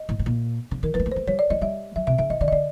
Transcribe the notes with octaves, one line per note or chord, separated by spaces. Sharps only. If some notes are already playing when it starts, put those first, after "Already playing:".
Already playing: D#5
A2
A2
A#2
C#3
D#3 A#4
E3 B4
G#3
A3
G#3 C5
G3 C#5
D5
G3 D#5
G3 E5
F#3 E5
C3 E5
C#3 E5
D#3 D#5
D3 D5
D#5
D3 D5